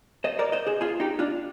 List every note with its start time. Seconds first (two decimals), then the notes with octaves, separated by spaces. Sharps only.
0.24 C5 D#5
0.39 A#4 D5
0.52 C5 D#5
0.67 G#4 C5
0.81 F4 G#4
1.00 D#4 G4
1.19 D4 F4